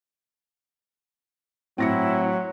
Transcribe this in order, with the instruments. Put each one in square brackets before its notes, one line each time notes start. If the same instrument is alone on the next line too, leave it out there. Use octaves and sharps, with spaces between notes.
[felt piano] A2 A#6 C#7 [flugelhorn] F#3 [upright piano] C4 [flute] E4